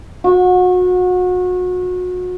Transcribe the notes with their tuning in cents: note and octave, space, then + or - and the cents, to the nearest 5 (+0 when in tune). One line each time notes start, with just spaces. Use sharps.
F#4 -30